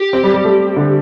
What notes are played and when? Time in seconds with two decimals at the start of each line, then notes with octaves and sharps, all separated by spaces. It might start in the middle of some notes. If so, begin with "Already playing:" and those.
Already playing: G4
0.13 C4
0.23 G3
0.34 G3
0.44 A3
0.77 D3